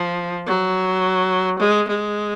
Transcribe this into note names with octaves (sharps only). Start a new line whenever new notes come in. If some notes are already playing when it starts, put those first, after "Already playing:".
Already playing: F3
F#3
G#3
G#3